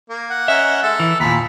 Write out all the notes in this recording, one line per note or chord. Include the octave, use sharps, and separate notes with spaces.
A#3
F#5
C#4 A#4 D#5 E5
G#3 A4
E3 E5
D#2 A#2 F3 A#5 B5